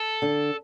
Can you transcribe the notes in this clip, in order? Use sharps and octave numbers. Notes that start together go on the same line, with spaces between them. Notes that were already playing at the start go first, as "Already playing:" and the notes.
Already playing: A4
D3